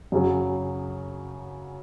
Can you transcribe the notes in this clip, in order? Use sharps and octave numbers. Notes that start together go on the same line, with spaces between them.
F#2 C#3 F#3